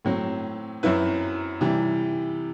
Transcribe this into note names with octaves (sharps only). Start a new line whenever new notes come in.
A2 F#3 C4
F#2 F#3 C4 E4 B4
C3 E3 G3